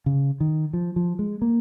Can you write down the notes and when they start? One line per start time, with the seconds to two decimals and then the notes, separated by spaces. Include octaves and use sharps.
0.06 C#3
0.40 D#3
0.73 F3
0.96 F3
1.19 G#3
1.42 A#3